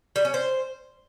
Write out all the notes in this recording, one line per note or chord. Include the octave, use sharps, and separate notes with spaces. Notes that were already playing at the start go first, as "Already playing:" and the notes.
G3
C#4
C5